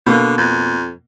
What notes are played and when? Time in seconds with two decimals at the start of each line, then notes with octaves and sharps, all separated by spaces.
0.06 B2 D3 A#3
0.38 F2